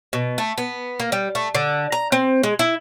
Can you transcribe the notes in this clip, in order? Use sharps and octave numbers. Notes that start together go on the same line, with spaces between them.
B2
A3
B3
A#3
G3
A3
D3
A#5
C4
G#3
E4